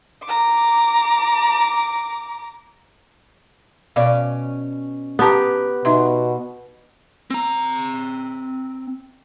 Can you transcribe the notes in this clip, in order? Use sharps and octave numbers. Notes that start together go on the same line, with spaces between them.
A#5 D6
B2 C#4 D5 F5
B3 G4 B4 A5 A#5
B2 D#4 E5 C6
C4 A#5